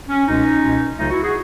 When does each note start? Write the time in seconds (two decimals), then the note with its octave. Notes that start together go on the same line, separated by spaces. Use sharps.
0.09 C#4
0.26 C#2 B2 G#3 C#4 D#4
0.62 C#2 B2 G#3
0.98 C#2 C#3 F#3 A3 D#4 F4
1.10 E4 F#4
1.22 F#4 G#4